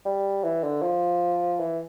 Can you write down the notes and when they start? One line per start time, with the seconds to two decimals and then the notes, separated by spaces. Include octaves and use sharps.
0.06 G3
0.44 E3
0.63 D3
0.82 F3
1.60 E3